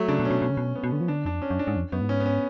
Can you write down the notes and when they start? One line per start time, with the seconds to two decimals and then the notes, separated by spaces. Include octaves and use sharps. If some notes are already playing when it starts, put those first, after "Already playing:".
Already playing: F#3 A3
0.08 C#3 D4
0.20 B2
0.25 C#4
0.31 B2
0.42 B2
0.50 C#3
0.57 B2
0.75 B3
0.84 B2
0.92 D3
1.01 F3
1.08 D3 D4
1.25 F2 D4
1.42 C#4
1.50 F#2
1.59 D4
1.67 G#2
1.76 F2
1.92 F#2 B3
2.01 G#2
2.09 C#4
2.20 B3
2.26 C#4